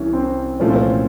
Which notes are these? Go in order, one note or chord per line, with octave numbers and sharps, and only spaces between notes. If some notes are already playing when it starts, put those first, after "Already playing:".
Already playing: C2 C3 E3 C#4
C4
C2 A#2 F3 A3 C#4
C4
C#4